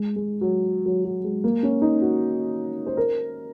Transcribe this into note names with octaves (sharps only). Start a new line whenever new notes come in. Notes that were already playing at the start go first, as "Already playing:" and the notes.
Already playing: G#3
G#3
F#3
F#3
F#3
G#3
A#3
C#4
D#4
F#4
C5
A#4